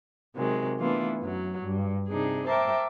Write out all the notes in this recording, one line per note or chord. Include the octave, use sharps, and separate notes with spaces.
C3 D#3 F#3 G#3
E3 A3 B3 D4 E4 F4
F#2 F#3
G2
C3 D4 D#4 G#4
A#4 C5 E5 G5 A5 D6